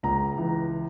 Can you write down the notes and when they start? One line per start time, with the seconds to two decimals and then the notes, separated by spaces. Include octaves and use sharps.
0.03 C#2 A#5
0.38 E3